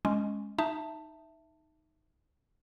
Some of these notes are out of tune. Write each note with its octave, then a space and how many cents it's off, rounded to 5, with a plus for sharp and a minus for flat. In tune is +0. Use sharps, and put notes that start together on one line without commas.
G#3 +0 C#4 +0
D#4 +0 E5 +0 A5 +10